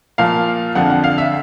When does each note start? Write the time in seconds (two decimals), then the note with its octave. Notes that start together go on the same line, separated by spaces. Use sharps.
0.18 A#2 F3 F5
0.75 F2 D3 F3 F#5
0.90 F#5
1.04 F5
1.18 E5